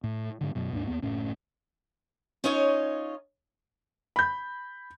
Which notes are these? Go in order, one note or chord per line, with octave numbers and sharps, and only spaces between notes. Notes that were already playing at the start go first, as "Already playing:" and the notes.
A2
G#2 D3
F#2 B2
D#2 G#2 F#3 D4
D#2 B3
F#1 A2 A3 C#4
C#4 D#4 F4 C#5 D#5
B5 G6